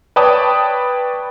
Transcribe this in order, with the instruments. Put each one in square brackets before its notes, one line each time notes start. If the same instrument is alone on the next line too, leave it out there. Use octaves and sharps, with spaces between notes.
[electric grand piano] B4 C#5 D5 G5 A5 D#6